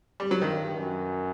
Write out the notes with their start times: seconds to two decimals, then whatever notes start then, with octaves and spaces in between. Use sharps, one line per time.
0.20 G3
0.31 F#3
0.42 G2 D#3
0.77 F#2